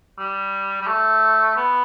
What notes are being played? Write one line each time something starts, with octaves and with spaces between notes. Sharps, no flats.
G3
G3
A3
B3